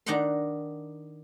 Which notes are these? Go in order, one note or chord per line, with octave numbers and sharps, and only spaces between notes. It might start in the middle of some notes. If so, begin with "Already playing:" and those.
D#3 D4 D#4 F#5 A#5 C6